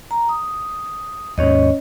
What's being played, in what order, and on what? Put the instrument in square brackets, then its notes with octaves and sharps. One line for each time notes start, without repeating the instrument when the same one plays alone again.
[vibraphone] A#5
D#6
[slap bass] D#2 G#2 [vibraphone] C#4 C#5 D#5